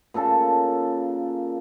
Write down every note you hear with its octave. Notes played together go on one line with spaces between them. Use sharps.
A#2 C#3 A4 A5